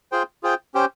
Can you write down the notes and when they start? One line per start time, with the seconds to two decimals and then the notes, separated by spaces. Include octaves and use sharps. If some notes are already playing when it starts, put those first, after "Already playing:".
0.12 F4 G#4 C5 G5
0.43 F4 G#4 C5 G5
0.74 C#4 G4 C5 G5